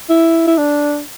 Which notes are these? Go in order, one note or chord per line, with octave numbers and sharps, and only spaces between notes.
E4
E4
D4